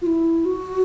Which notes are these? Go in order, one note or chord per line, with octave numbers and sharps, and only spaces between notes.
F4
E4
F#4